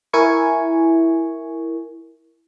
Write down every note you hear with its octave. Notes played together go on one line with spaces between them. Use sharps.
E4 A#4 G#5 C#6